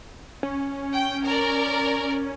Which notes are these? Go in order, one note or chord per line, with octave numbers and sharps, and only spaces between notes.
C#4
G5
A#4 D5